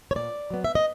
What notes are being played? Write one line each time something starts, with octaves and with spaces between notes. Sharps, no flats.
C#5
A#2 D5
F#3 B3
E5
D#5